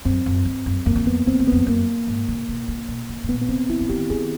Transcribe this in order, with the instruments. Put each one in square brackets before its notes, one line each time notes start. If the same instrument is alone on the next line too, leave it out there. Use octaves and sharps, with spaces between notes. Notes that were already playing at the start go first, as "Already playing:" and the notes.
[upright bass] F#2 [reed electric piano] C4
[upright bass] F#2
G2
F#2
[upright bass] F2 [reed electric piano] A#3
[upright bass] F#2
[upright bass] F2 [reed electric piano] B3
[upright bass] F2 [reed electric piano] C4
[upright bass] E2
[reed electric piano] B3
[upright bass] F2
[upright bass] F#2 [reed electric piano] A#3
[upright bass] G#2
C3
B2
C3
B2
B2
A2
[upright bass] A#2 [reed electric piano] B3
[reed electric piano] B3
[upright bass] C3 [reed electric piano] C4
[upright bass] C3 [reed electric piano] E4
[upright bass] E3
[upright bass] D#3 [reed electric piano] G4
[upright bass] D#3 [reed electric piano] G#4